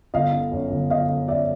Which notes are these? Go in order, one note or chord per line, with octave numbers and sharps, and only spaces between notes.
G1 D#5 F5
D3
F#2
G1
G1 D#5 F5
D3
F#2 D5 E5